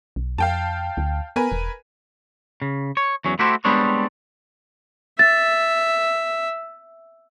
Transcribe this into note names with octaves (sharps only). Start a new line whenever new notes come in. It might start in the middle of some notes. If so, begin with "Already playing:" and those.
B1
F2 F5 G5 A5
D2
B3 A#4 B4 G#5
E1
C#3
C#5
E2 F#3 C#4
A3 E4 F#4 G4 A4 C5
G3 G#3 B3 C4 D4 C#5
E5 A6